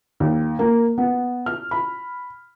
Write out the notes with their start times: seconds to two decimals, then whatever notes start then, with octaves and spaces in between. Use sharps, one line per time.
0.20 D#2
0.59 A#3
0.98 B3
1.46 F6
1.71 B5